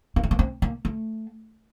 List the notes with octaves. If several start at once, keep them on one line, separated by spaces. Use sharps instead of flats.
A#3
A3
A#3
C4
A#3
A3